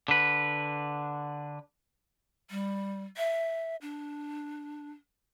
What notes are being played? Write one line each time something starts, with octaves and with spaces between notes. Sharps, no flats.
D3 B4
G3
E5
D4